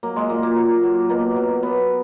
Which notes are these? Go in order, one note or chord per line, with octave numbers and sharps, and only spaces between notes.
F#3 A#3
G#3
A#2 A#3
A#3
F#3
F#3
B2 A#3
F#3
F#3 B3